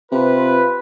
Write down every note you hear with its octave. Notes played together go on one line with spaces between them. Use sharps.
C3 F4 B4